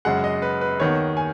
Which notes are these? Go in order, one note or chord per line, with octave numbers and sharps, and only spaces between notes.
F#2 C#3 G#3 F#5
D#5
B4
B4
D#2 D#3 B3 C#5
G#5